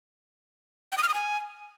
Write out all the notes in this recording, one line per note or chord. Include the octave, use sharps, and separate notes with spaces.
G5
D#6
F6
D#6
G#5